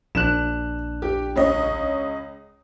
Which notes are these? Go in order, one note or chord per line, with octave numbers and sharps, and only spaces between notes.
A#1 D4 F#6 E7
G4
C#2 C#5 D#5